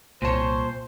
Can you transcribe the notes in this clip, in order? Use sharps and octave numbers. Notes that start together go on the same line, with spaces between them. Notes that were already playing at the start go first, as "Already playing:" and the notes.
C2 A#2 C5 C#5 A5